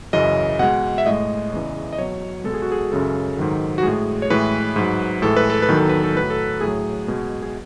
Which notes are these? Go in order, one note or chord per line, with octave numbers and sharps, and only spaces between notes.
F#2 C#3 E3 D#5
B2 G#3 F#5
E5
A2 G#3 D#5
E2 C#3 E3
D#5
B2 F#3 C#5
B2 G#3 A4
G#4
F#4
G#4
F#2 C#3 G#3 A4
G#2 D#3 F#3
F#4
A2 G#3 G#4
C#5
A2 E3 G#3 B4
G#2 F#3
A2 E3 G#3 A4
B4
A4
B4
E2 D#3 F#3
A4
B4
A4
A2 F#3 B4
A4
A2 F#3 G#4
B2 G#3
G#4